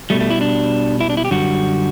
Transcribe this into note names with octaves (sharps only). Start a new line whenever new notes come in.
B2 G3 A3
A3
E4
D4
E4
D4
E4
G4
F#2 D3 G3 F#4